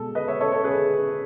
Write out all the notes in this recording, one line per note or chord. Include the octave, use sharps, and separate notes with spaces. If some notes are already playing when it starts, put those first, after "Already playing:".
Already playing: B2 G#3 A4
B4 D#5
C#5 E5
A4 C#5
A4 C#5
G#4 B4